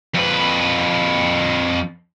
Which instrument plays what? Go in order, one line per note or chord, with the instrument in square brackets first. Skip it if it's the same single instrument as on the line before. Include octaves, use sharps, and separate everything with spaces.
[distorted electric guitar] F2 B4